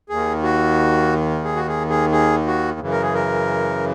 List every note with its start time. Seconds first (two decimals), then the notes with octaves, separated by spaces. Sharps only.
0.09 D#2 D#3 G#4
0.43 F#4
1.44 G#4
1.56 F#4
1.68 G#4
1.90 G#4
2.12 G#4
2.46 F#4
2.80 F#2 C#3 E3
2.91 A#4
3.02 G#4
3.14 A#4